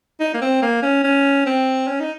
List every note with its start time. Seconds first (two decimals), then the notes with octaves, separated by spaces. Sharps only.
0.20 D#4
0.34 A#3
0.42 C4
0.62 A#3
0.82 C#4
1.04 C#4
1.46 C4
1.87 C#4
2.00 D#4